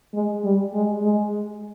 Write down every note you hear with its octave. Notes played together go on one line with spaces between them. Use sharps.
G#3
G3
G#3
G#3